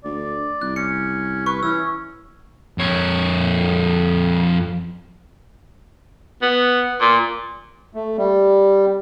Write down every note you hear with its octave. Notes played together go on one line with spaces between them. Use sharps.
D2 D5
C2 F#6
C#4 C#7
B4 C#6
E3 C#4 E6
F2 C#5
B3
A#2
A3
G3